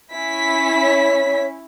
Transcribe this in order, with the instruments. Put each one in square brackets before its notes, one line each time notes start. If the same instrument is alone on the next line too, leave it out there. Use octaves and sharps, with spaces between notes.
[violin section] C#4 E4 B6
[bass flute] C#5